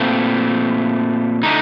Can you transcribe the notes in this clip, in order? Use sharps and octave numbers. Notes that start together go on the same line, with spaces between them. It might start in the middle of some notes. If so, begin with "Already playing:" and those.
Already playing: A#2 A3 C4
D3 A3 D#4